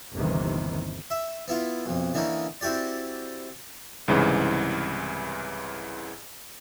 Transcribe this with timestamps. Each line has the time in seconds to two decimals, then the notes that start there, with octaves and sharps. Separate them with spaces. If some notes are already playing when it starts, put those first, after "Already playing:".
0.14 G1 D#2 C3 D#3 E3
1.10 E5
1.48 B3 E4 F4
1.85 B1 F2
2.14 D3 E3 A#3 C#4 D#4
2.61 C4 E4 F#4 G4 D5
4.08 C2 G#2 C#3 E3